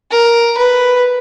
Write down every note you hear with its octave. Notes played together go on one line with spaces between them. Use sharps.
A#4
B4